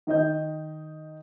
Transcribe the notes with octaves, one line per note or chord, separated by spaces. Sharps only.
D#3 D#4 D#5 G6